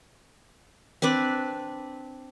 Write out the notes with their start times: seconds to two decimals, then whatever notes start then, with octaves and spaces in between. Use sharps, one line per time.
1.02 C4 D4 B4 D5